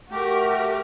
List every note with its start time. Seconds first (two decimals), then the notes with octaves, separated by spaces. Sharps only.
0.11 A3 F#4 G4 A#4